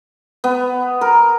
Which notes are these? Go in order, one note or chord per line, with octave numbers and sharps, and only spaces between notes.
B3
A#4